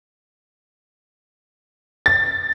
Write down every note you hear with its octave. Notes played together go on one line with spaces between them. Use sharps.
A6